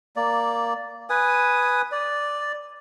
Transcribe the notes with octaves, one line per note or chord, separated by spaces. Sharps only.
A#3 D5
B4 G#5 D#6
D5